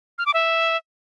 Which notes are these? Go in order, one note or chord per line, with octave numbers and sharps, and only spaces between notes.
F6
D6
E5